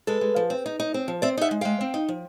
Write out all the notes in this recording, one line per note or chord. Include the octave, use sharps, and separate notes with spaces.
G#3 A4 B4
G#3
F3
C4
D#4
D#4
C4
F3
C4 D5 E5
D#4 E5 F#5
G#3
G#3 F5 G5
C4
D#4
F3